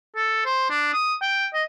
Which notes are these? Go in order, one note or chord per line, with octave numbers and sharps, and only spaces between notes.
A4
C5
D4
D#6
G5
D#5